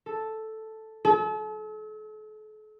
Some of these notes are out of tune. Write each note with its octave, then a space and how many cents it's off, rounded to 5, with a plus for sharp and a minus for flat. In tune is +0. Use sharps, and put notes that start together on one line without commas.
A4 +0
A4 -40